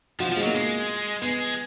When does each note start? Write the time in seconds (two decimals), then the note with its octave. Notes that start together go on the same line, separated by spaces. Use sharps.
0.20 F3 F#4
0.28 F4
0.32 F3 G#3
0.42 F#3 A#3
0.54 G#3 A#3
1.22 G#3 B3